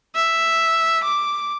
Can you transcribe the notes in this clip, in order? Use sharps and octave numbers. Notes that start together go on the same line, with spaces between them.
E5
D6